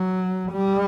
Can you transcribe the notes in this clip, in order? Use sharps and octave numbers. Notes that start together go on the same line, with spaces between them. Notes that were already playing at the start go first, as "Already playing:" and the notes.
Already playing: F#3
G3